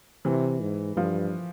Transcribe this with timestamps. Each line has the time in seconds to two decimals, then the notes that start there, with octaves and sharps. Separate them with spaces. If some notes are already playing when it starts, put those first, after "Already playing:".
0.25 C3 E3
0.61 G#2
0.96 G2 F3